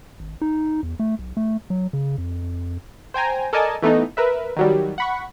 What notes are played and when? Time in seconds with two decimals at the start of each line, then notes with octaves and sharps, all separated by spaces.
0.20 G#1
0.42 D#4
0.83 E2
0.99 A3
1.19 B1
1.37 A3
1.70 F#3
1.93 C#3
2.18 F2
3.14 C5 G5 G#5 A#5
3.53 A4 A#4 D5 D#5 G#5 A5
3.82 E3 A3 B3 D#4
4.17 A#4 B4 E5
4.56 D#3 F#3 G3
4.98 F#5 B5 C#6